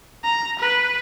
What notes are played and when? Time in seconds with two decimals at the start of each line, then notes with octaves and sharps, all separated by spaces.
0.24 A#5
0.60 B4